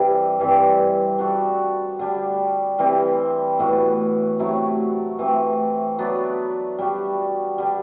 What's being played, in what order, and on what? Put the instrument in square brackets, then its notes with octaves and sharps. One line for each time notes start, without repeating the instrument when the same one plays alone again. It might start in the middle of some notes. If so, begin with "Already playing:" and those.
Already playing: [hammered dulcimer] C3 E3 G3 C4
G2 E3 G3 C4
G3 D4 F#4 A4
D3 G3 D4
E3 G3 C4 E4
A2 E3 B3 F#4
C3 F#3 A3 E4
E3 A3 C4
F#3 B3 D4
G3 D4 F#4
D3 G3